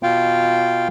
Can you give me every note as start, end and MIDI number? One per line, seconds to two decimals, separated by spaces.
0.03 0.88 47
0.03 0.88 65
0.03 0.88 77
0.03 0.88 79